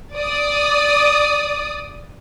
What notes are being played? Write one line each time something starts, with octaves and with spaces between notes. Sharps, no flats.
D5 D#6